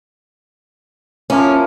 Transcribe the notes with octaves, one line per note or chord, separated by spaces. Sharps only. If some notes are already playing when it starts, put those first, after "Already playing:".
F3 A#3 C#4 E4